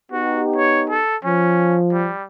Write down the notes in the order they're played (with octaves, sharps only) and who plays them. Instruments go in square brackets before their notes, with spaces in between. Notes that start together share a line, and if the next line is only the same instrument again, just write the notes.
[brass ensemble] B3 D#4 G4 [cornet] F#4
[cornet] C#5
A4
[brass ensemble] F3 [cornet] C#4
[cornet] G3